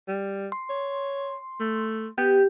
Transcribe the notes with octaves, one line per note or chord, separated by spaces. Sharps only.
G3
C6
C#5
A3
B3 G4